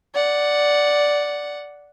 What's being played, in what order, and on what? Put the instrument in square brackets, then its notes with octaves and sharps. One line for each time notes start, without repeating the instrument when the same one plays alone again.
[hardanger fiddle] D5 F#5